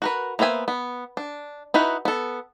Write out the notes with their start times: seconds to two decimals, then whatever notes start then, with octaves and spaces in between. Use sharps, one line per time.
0.02 F#4 A#4 B4
0.39 A#3 B3 C5 E5 G#5
0.68 B3
1.17 D4
1.74 D#4 E4 F#4 B4
2.05 B3 A4